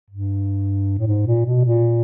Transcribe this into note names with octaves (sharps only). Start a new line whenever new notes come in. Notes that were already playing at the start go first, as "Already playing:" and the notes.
G2
A2
G#2
A#2
B2
A#2